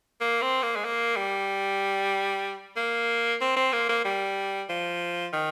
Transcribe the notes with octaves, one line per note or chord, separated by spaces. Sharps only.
A#3
C4
A#3
G#3
A#3
G3
A#3
C4
C4
A#3
A#3
G3
F3
D#3